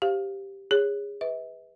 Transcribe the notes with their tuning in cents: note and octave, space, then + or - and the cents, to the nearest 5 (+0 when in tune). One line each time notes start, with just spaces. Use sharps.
G4 +0 C5 -5 F5 +0
G#4 -25 C#5 +0
B4 +5 E5 -45